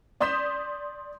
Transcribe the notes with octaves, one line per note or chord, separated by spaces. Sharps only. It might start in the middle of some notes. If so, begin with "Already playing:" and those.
D5 C6 D#6 G6 B6 E7